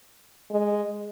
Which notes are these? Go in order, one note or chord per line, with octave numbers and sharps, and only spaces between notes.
G#3